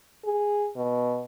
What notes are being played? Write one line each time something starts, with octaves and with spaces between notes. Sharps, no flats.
G#4
B2